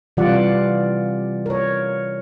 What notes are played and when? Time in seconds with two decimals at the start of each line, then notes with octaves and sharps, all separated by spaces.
0.17 C3 E3 G3 F4 D5 F#5
1.46 A#4 C#5